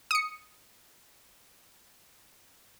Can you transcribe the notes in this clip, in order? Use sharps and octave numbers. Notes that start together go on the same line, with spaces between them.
D#6 C#7